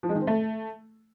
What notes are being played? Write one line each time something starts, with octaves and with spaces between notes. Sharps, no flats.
F3
G#3
D#3
C4
A3